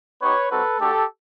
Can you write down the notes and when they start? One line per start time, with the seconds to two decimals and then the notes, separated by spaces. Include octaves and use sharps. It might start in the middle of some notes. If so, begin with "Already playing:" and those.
0.21 B3 D#4 G4 B4 C#5
0.50 G3 C4 D#4 F#4 A4 B4
0.79 A3 D4 F#4 G4 A4